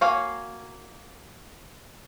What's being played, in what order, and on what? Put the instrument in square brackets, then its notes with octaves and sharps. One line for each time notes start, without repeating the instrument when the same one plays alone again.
[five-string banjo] A#3 F#4 C#5 F5 G#5